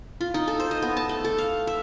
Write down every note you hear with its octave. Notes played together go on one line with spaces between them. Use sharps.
F4
D#4
A4
C5
D#5
B3
A5
A3
A4
F5
E5